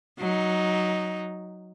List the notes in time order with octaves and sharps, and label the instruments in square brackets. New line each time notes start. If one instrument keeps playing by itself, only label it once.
[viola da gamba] F#3 D#4